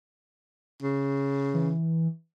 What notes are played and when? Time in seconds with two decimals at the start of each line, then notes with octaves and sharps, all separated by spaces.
0.83 C#3
1.54 E3